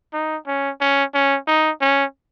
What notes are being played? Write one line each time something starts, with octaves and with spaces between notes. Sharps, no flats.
D#4
C#4
C#4
C#4
D#4
C#4